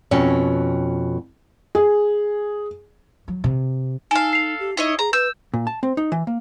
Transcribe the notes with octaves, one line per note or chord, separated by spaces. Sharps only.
F2 B2 C#4
G#4
F#3
C3
D#4 A4 F5 G#5
C7 F7
G4
D#4 E4 C#5 D#5
G#4 A#5
B4 E6 G6
A#2
A5
C4
D#4
E3
A#3